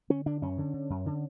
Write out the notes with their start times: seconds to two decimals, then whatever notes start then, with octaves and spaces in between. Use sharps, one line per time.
0.10 D3 C#4
0.26 D3 D4
0.42 F#2 C#4
0.58 D3
0.74 D3
0.90 F#2
1.06 D3